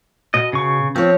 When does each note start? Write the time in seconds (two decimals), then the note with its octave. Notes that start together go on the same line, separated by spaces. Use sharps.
0.34 B2 D#5
0.53 C#3 C#6
0.96 F3 C4 C#5